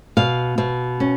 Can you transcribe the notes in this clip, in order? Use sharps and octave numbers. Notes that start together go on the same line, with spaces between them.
B2 F5
B2
C#4